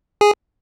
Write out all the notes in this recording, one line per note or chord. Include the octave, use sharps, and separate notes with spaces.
G#4